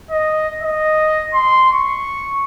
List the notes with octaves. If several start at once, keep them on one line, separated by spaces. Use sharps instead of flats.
D#5
D#5
C6
C#6